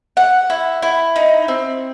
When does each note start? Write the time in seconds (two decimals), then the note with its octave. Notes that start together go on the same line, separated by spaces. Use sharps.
0.17 F#5
0.50 E4
0.82 E4
1.16 D#4
1.48 C4